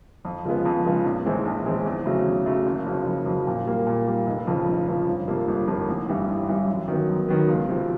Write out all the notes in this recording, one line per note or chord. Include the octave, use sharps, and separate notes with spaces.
F2
C#3 F3 G#3 B3
F2
C#3 F3 G#3 B3
A#1
A2 E3 G#3 C4
A#1
A2 E3 G#3 C4
E2
C#3 F#3 A3
E2
C#3 F#3 A3
F#1
F2 C#3 F#3
F#1
F2 C#3 F#3
A#2
G3 A#3
A#2
G3 A#3
F1
F2 C#3 F3
F1
F2 C#3 F3
G1
F2 C3 F3 A#3
G1
F2 C3 F3 A#3
A1
G2 E3 G3
A1
G2 E3 G3
F#2
D#3 F#3 B3
F#2
D#3 F#3 B3
C#2
C3 F3